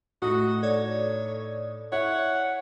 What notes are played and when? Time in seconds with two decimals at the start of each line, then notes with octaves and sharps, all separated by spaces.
0.22 A2 D#4 F#4 D#6
0.63 A4 C#5 D5
1.92 E4 C#5 F#5